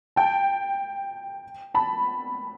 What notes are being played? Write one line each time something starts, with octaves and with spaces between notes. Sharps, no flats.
G5 A5
A5 B5